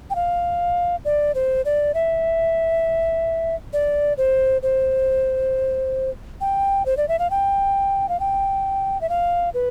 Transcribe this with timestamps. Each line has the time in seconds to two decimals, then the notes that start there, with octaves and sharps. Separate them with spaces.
0.10 G5
0.15 F5
1.05 D5
1.35 C5
1.65 D5
1.94 E5
3.73 D5
4.18 C5
4.63 C5
6.41 G5
6.86 C5
6.97 D5
7.08 E5
7.19 F5
7.30 G5
8.09 F5
8.20 G5
9.01 E5
9.09 F5
9.54 B4